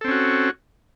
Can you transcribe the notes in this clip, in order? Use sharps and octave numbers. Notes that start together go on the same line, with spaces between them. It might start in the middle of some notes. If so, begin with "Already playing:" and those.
C4 C#4 F#4 A4